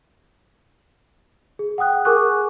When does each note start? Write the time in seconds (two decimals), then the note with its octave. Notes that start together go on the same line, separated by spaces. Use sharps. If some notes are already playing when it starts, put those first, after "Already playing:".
1.59 G#4
1.78 F#5 G5 D#6 F#6
2.05 G#4 A#4 G#5 C#6 D6 F#6